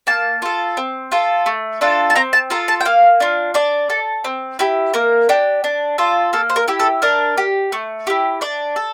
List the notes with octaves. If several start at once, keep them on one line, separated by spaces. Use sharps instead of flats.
A#3 A5
F4 A4
C4
F4 A4
A3
D4 F4 A4
A5
C4 A#5
A5
F4 A4 A#5
A5
G5
A#3 F5
D4 F4
D4 D5
A4
C4
E4 G4
A#3 A#4
D4 G4
D4
F4 A4
A#3 A4
C5
A#4
E4 G4
A4
D4 A#4
G4
A3
E4 G4
D4 D5
A4